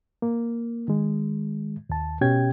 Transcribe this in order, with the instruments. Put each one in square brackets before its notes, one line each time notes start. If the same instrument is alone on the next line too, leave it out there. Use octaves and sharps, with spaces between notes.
[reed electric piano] A#3
D#3 G#3
D#2 A5
B2 C#4 G4 G5 G#6